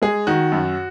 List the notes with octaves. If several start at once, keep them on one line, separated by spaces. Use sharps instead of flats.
G#3 G#4
D#3 F#4
F#2